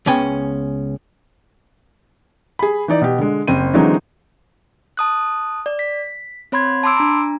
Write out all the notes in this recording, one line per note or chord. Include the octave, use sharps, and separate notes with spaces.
C#2 B3 C#4 G5 G#5
G#4 B5
E3 D#4 D5
B2 G4
D3 G#3
F#1 C4 D#7
D3 E3 F#3 G#3 C4 D#4
A5 D#6 F#6
D5
B6
C4 C#5 B5 C6 G#6
A5 B5 C6 D6 E6 D7
D4 A#5